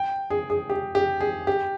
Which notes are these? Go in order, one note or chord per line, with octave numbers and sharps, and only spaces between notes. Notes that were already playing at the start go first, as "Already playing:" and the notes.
Already playing: G5
G#4
G#4
G4
G4
G#4
G4